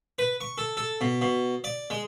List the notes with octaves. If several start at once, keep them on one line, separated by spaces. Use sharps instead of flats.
B4
C#6
A4
A4
B2
B2
D5
G#3